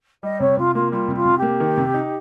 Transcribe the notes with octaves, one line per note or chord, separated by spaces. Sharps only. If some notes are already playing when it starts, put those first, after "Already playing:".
G3 D#5
C3 C#5
C3 F4
A#3 F4
G3 F4
C3
F4
C3
A#3 G4
D#3
C3
D#4